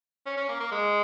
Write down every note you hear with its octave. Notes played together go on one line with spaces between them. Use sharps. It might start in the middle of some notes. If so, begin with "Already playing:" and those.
C#4
C#4
A#3
A#3
G#3